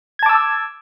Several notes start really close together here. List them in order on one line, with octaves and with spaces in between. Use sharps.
G#6 A5 D6 E6